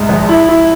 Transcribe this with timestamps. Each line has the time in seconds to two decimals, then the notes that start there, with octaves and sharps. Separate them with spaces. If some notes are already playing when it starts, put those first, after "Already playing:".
Already playing: C2 G#2 G#3
0.09 A#1
0.29 E4
0.49 E4